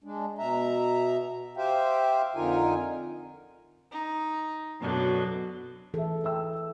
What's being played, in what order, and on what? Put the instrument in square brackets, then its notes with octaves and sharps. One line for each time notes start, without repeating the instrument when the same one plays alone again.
[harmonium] G#3 D4
B2 E5 A#5
G4 C5 E5 F5 G5
F2 D3 D#4 F4 A#4 G#5
[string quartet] D#4
F#2 B2 D3 F#3
[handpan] E3 A4 [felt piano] G#4 E5
[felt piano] E5 G5 E6